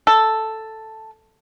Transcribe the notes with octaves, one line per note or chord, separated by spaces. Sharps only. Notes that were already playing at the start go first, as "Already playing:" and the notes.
A4